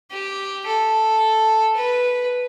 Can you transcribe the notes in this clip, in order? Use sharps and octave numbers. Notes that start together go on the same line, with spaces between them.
G4
A4
B4